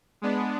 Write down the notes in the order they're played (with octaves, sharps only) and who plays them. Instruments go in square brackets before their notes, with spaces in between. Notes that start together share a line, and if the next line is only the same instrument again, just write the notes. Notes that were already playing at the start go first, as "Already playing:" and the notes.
[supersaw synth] G#3 B3 D4